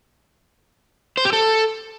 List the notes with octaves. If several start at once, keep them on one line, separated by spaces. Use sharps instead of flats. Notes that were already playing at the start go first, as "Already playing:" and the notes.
C5
G4
A4